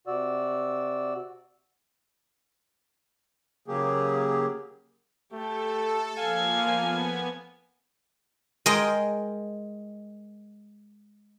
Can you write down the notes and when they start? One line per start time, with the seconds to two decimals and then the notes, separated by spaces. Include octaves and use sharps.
0.07 C3 F#4 D5 E6
3.68 C#3 F#3 A#3 G4 G#4
5.33 A3 G4 A4
6.19 F3 A#3 F5 G#5
6.71 B3
8.66 G#3 A#4 D#5 G5